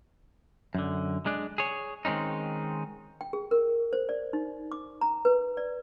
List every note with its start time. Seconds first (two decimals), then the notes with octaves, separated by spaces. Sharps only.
0.75 F#2 D3
1.26 G#3 D4
1.58 G#4 C#5
2.05 D#3 G#3 C4 C#4 D#4
3.21 G5
3.33 G#4
3.51 A#4
3.93 C5
4.09 D5
4.33 D#4
4.72 D6
5.01 A#5
5.25 B4
5.57 D5